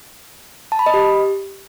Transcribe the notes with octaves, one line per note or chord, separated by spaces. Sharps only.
A5
B5
D#5
G4